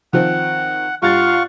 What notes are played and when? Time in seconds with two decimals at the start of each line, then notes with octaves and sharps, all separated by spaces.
0.13 D#3 F3 C4 F#5
1.02 G2 F4 F5 F#5 C#6 A6